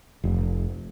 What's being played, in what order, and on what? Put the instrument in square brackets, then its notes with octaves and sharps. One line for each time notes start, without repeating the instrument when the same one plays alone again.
[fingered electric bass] F1